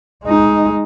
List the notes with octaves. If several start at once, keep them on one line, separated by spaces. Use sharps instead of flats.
G#3 D#4